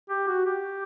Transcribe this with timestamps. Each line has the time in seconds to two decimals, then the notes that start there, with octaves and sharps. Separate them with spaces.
0.10 G4
0.28 F#4
0.46 G4